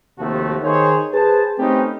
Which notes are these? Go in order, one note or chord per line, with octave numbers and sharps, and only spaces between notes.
D#2 C3 F3 A3 F#4 A5
D#3 D#4 G#4 C5 C#5
G#4 B4 C5 A5
A3 C4 C#4 D#4 G4 B4